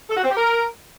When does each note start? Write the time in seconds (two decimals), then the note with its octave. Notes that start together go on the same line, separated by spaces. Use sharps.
0.10 A4
0.17 F#4
0.23 C4
0.30 G4
0.37 A#4